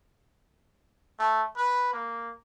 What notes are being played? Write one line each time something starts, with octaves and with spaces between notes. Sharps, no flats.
A3
B4
A#3